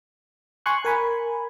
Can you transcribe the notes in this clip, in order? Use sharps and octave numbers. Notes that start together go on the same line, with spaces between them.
G#5 C6 C#6 F#6
A#4 G#5 B5